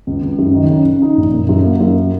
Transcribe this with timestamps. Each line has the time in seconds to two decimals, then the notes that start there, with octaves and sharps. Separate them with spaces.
0.07 C#2
0.22 C#2
0.39 F#2
0.54 D#3
0.70 C#3
0.85 C#3
1.02 D#4
1.17 A#1
1.33 F#1
1.49 F#2
1.65 A#3
1.81 F#2